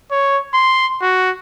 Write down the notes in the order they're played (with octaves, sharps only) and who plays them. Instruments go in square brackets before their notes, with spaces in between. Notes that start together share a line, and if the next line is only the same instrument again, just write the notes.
[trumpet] C#5
C6
F#4